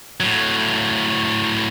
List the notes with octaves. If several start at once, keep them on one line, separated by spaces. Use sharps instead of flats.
A2 F#3